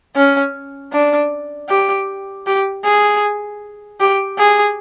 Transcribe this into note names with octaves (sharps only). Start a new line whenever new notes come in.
C#4
D4
G4
G4
G#4
G4
G#4